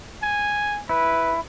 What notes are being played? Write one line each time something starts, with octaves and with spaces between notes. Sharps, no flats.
G#5
E4 B4